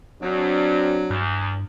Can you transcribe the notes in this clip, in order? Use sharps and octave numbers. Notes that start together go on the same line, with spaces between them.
F#2 F#3 C4 D4 F#4
E2 G2